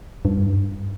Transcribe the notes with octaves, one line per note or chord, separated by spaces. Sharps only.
G2